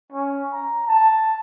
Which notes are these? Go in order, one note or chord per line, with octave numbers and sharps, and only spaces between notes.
C#4
A#5
A5